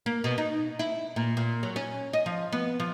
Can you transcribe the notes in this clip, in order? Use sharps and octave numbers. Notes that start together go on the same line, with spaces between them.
A#3
B2
D#4
E4
A#2
A#2
F#3
C#4
D#5
F3
B3
F3